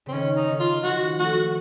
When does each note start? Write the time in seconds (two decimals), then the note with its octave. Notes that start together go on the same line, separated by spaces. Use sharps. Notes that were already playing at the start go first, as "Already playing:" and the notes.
0.06 C#3 C4
0.12 D#3 C#4
0.36 D#4
0.48 D#3
0.60 F4
0.83 F3 F#4
1.18 A3 F#4